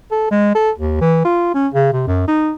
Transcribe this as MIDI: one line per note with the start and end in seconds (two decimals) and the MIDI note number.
0.11 0.30 69
0.31 0.53 56
0.55 0.71 69
0.78 0.99 39
1.01 1.20 52
1.25 1.53 65
1.55 1.68 61
1.74 1.91 49
1.93 2.04 48
2.07 2.25 42
2.28 2.52 63